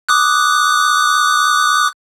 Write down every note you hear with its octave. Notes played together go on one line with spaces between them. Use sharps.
D6 D#6 F#6